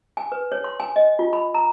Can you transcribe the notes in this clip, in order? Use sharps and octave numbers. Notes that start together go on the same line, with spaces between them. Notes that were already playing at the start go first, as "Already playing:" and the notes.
G#5
B4
C#5
C6
G#5
D#5
F4
B5
A#5